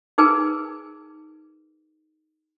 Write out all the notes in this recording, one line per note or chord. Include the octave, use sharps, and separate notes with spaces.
D#4 G#4 A#4 B4 G#5